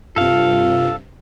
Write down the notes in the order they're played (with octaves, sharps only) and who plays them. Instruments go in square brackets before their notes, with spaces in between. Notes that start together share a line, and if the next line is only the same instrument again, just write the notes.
[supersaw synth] G2 C3 [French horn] F4 [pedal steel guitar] A4 F5